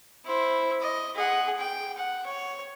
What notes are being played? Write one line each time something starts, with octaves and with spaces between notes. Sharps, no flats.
E4 C5
D#5
G#4 F#5
G5
F#5
C#5